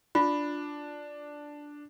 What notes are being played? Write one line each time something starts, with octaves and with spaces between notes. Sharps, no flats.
D4 F4